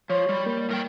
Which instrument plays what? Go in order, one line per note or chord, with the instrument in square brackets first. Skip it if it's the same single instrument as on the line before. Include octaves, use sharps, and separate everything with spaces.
[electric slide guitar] F3 [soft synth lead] C#5
[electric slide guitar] G3
[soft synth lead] A#3
[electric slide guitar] A2 A#4 G5